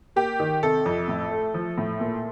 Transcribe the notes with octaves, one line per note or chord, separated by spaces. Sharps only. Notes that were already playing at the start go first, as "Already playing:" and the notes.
A#3 G4
D#3
C3 A4
F2
A2
A3
F3
A2
A#2